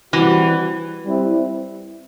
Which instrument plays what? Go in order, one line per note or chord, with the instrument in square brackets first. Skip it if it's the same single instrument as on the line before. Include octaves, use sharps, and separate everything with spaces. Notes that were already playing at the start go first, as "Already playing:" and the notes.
[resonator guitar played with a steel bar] E3 [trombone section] G3 C4 F#4
[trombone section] G3 C4 E4